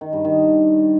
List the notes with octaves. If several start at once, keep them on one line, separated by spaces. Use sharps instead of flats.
D#3
G2
D#3